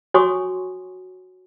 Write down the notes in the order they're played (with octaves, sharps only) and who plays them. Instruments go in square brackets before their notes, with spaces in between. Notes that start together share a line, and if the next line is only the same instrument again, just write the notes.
[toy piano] F#4 C#5 G#5 C6 C#6 D#6